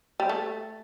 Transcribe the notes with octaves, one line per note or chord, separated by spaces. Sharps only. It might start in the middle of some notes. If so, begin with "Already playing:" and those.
G3
A3